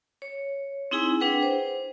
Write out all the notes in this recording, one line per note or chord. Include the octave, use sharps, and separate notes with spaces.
C#5
C4 D#4 E4 G#4 G#5
D4 G#4 B4 F#5 G5
C5